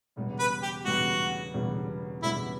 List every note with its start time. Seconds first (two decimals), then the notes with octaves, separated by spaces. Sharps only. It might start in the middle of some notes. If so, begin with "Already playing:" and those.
0.16 E1 E2 C#3 G3 B3
0.39 B4
0.62 G4
0.85 E1 E2 C#3 G3 B3 F#4
1.54 E1 E2 C#3 G3 B3
2.22 E1 E2 C#3 G3 B3 E4